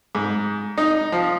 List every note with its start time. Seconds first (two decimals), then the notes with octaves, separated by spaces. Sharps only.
0.15 G#2
0.77 D#4
1.12 F3